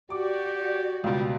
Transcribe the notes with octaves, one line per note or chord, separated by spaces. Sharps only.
F#4 G4 D5 D6
C#2 B2 G3